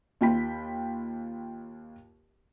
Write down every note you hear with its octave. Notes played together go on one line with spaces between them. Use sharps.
D#2 F4 G5 B5 B6